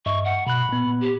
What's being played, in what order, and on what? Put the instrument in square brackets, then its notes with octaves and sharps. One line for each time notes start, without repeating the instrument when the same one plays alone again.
[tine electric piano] G2 D#5 E5 [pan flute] C#6
[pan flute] F#5
[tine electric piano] B2 F#6 [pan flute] B5
[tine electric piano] A#2 B3
[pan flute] G4